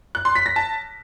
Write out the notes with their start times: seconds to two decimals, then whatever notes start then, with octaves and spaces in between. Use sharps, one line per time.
0.15 F#6
0.25 C6
0.35 B6
0.46 A#6
0.56 A5